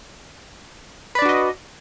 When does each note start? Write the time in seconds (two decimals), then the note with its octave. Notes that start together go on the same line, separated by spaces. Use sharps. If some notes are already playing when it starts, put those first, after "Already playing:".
1.15 B4
1.19 D5
1.22 D4
1.25 F#4
1.29 D#5